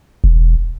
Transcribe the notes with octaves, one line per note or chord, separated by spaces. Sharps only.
E1